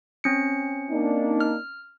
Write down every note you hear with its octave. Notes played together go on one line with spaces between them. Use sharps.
C4 C#4 C#7
A#3 D4 D#4
F6